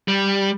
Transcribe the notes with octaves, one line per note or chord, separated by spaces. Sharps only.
G3